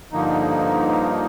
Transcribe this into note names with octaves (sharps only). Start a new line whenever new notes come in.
G2 D3 F3 A#3 D#4